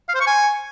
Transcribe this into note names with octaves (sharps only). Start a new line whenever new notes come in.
F5
C5
C#6
G#5